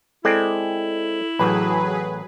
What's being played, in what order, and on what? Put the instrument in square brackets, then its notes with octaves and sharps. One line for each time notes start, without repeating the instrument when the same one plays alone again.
[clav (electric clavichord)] G#3 C4 D5 [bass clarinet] E4 [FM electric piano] A4
[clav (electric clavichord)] A1 [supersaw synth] F#3 G#4 B4 [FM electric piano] B5